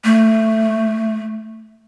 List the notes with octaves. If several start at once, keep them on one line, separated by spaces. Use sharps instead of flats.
A3